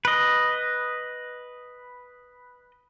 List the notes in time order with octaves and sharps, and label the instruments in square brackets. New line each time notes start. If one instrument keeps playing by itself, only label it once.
[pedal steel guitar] B4 D#5